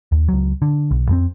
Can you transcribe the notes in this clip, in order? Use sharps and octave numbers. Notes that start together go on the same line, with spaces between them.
D#2
C#2 F#3
D3
B1
F2 G#3 C4